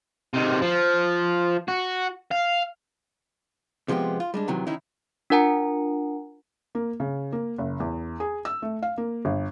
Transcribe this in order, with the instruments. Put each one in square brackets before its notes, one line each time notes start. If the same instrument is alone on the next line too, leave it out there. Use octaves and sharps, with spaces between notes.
[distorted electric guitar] C3 D#3
F3
F#4
F5
[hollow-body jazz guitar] C3 F3 G#3 B3 G4
F4
G3 G#3 D4
C3 D#3 E3 F#3
D#3 C#4 D#4 E4
[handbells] D4 F4 A#4 F#5 G#5 A#5
[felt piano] A#3
C#3
A#3
F#1
E2
G#4
E6
A3
F5
A#3
G1